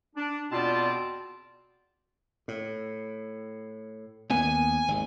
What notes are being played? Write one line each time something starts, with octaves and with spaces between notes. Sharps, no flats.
D4
E2 B2 C4 F4 D5 A5
A2
D#2 A#3 B3 G#5
G#1 D#2